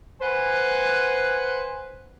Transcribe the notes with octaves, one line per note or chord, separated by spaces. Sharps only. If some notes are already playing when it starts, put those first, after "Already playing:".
B4 C5 F#5 G#5